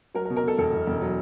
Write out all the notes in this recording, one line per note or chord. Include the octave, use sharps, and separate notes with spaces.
F#3 A#4
A#4
B2
A#4
B2 A4
E1 A4
E1
E1
F#3